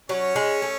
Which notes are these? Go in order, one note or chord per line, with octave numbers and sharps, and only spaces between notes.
F#3 C#4 C#5
G#3
A3